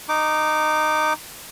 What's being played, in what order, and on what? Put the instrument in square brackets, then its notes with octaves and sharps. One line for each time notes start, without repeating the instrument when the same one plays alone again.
[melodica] D#4 D6